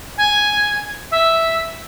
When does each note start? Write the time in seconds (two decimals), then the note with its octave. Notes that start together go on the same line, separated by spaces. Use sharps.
0.18 G#5
1.11 E5